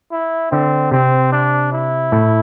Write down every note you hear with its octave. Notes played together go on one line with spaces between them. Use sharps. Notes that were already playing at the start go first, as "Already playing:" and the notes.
E4
D3 C4
C3 C4
D4
E4
A2